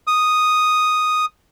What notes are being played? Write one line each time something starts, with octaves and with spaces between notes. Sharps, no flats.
D#6